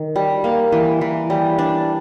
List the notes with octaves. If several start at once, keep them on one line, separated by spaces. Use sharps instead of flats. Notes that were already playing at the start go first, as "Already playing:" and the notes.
Already playing: D#3
G3
A#3
E3
E3
G3
D4